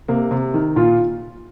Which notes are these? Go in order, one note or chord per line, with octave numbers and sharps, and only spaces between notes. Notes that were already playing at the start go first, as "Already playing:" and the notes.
C3 A#3
C3
D#3
A#2 F4